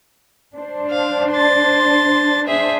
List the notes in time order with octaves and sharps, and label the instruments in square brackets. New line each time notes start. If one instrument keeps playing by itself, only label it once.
[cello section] D4 C5
[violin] F5
C6 A6
[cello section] D4 C5 [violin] G#4 E5